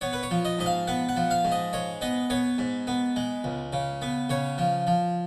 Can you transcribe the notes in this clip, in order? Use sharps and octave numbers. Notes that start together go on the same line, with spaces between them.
B3 C#5
B4
C#5
F3
D#5
G#2 D#5
F5
B3 F#5
F#5
F3
F5
G#2
D#5
G#3 C#5
B3 D#5
B3 C#5
G#2
B3
G#3
C#2
C#3
B3
C#3 C#5
F3
F3